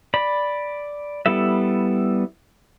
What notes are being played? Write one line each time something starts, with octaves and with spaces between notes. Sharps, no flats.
D5 B5
G3 B3 E4 A4 E5